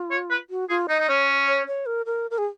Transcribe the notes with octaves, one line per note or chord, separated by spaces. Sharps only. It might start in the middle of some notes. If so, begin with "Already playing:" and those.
Already playing: F4
C#5
B4
F#4
F4 G#4
D#4 D#5
D#4
C#4 C#5
C#5
C#5
A#4
A#4
A#4
G#4